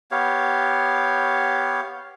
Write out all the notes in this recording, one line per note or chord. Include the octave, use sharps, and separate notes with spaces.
B3 G4 C#5 F5